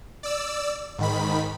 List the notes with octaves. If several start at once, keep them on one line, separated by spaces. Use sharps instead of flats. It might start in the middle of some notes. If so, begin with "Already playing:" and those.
D5 E6
G#2 D#3 B5